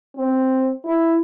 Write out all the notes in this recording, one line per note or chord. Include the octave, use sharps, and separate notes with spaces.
C4
E4